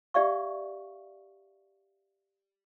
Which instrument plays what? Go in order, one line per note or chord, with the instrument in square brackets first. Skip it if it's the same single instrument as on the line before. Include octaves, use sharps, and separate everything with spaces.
[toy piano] G4 D5 E5 F5 C#6